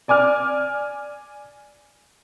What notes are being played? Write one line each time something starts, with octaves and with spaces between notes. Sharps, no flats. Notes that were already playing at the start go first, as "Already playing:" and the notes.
D5 G#5 D6 F6